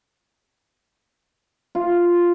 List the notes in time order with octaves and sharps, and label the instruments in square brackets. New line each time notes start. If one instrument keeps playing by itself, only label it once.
[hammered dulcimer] F4